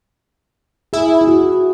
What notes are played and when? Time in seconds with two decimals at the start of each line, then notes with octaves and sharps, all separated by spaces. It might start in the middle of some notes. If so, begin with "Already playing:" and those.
0.93 E4 G#4
1.21 E4
1.28 F#4